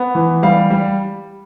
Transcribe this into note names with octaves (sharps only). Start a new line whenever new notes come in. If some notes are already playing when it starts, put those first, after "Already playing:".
Already playing: B3
E3
G3 F5
G3